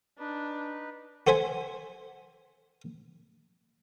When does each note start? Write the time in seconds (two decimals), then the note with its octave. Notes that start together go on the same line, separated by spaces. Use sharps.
0.19 D4 D#4 B4
1.27 F#4 A4 C5 E5 G#5